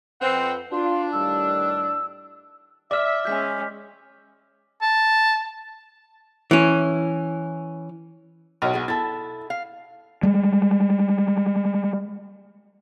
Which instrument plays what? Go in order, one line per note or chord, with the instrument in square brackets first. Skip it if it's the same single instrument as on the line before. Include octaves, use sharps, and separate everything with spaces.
[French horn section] F2 B4 [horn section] C4 F#5
[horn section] D4 [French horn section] F4 [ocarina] C6
[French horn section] A2 D#3 G3 [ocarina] E6
[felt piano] D5 [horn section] E5 [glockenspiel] D6 F6
[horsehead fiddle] G#3 C#4 [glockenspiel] G6 B6
[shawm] A5
[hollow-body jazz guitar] E3 C#4
[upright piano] B1 [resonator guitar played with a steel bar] A#4 C#5
[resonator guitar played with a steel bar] B3 E4 G#4
[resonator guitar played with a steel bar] E4 A4 [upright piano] A6
[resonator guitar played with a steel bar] F5
[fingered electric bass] G3 G#3